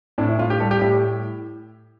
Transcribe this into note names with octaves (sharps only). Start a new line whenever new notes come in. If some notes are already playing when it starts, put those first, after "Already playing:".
A2 D4
E4
A2 F4
G4
G3 A4
G4
A2 G4